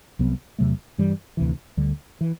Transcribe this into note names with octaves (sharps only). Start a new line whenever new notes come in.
C2 C3 F#3 B3
E2 C3 F#3 A3
G2 E3 G3
D2 C3 E3
D2 D3 G3
E3